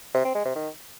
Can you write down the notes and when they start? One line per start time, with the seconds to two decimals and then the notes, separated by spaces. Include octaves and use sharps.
0.15 C3
0.25 C4
0.35 G#3
0.45 C3
0.55 D#3